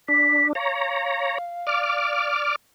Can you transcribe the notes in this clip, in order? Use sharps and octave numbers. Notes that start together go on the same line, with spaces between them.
D4 B6
C#5 F5 A#5
D5 D6 F6